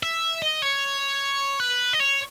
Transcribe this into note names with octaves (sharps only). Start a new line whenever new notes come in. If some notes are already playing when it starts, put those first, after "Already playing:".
E5
D#5
C#5
B4
D#5
C#5